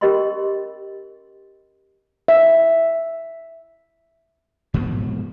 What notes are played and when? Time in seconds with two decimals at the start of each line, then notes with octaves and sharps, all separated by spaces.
0.01 C#4 G4 A#4 D#5 B5 C6
2.28 E5
4.74 G#2 B2 F3 F#3